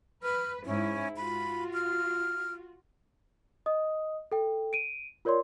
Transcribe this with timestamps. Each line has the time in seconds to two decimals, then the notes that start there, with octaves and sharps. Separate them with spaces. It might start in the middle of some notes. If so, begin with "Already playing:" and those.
0.23 B4 F6
0.65 G#2 C#4 E4
1.16 F4 F#4 B5
1.73 F6
3.66 D#5 D#6
4.32 A4 G5
4.73 D7 D#7
5.25 F4 A#4 C#5 D5 C6